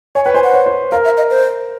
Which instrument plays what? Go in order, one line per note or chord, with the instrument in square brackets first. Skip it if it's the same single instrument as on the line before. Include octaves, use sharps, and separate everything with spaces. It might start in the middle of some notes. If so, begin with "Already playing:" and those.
[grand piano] C#5 [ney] G#5
[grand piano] B4 [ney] G5
[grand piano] C5 [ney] G#5
[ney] F#5
[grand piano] C#5
C5
[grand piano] A#4 [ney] F5
[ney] E5
D#5
C5